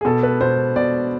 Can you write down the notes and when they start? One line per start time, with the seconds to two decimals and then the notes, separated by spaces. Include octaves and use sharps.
0.01 G#4
0.05 B2 A4
0.23 B4
0.41 B2 C5
0.76 B2 D5